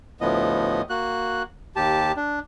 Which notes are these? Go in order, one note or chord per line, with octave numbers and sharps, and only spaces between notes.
D2 A2 F3 B3 D#5
A#3 F#4 F#6
D#2 G4 A5
D4